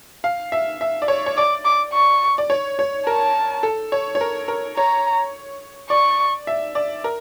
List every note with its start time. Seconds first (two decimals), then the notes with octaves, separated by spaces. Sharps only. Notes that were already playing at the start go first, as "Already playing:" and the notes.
0.24 F5
0.52 E5
0.81 E5
1.02 D5
1.08 C#5
1.26 C#5
1.37 D5 D6
1.65 D6
1.93 C#6
2.38 D5
2.50 C#5
2.79 C#5
3.06 A#4 A5
3.63 A4
3.92 C#5
4.15 C#5
4.21 A#4
4.48 A#4
4.77 C#5 A#5
5.90 D5 C#6
6.47 E5
6.75 D5
7.04 A#4